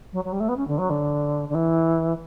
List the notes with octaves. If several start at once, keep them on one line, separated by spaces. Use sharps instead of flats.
F#3
F#3
G3
A3
B3
C#4
D3
F#3
D3
D3
E3